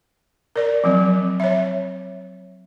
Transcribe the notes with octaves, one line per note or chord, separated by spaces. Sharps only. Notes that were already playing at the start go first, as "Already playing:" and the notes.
A#4 D5
F3 F#3 C4
C#5 E5